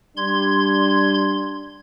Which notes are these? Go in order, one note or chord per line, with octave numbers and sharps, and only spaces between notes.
G3 D4 C6 G#6